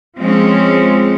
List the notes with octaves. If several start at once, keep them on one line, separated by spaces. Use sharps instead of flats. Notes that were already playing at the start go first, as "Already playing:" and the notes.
F3 G#3 C4 C#4